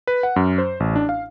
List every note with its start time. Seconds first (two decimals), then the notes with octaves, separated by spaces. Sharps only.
0.07 B4
0.23 F#5
0.36 F#2
0.58 C5
0.80 A1
0.96 D4
1.09 F5